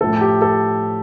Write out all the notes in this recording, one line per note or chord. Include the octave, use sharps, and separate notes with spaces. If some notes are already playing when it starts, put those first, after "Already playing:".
A2 F3 A3 A4
G4
A4